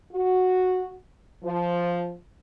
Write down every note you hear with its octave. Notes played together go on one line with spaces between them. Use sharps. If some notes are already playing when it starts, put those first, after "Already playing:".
F#4
F3